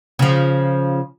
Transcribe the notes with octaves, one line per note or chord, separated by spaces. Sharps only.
C#3 F3